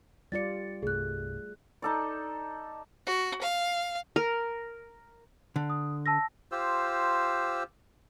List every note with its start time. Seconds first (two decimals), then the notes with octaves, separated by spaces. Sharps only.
0.32 G3 F4 D5 A6 C#7
0.83 C2 G2 A3 G#4 F#6
1.82 D#4 A4 D5
3.06 F#4
3.41 F5
4.16 A#4
5.56 D3
5.70 D#6
6.06 A5 E6 A#6
6.52 F4 G4 C5 E6